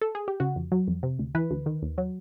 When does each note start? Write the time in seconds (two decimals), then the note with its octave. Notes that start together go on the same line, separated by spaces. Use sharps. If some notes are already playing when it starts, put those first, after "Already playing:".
0.01 A4
0.15 G#4
0.28 G4
0.40 C#3 F#4
0.56 F2
0.72 F#3
0.88 F2
1.03 C3
1.19 D2
1.35 E3 B4
1.51 D2
1.66 D#3
1.82 D#2
1.98 F#3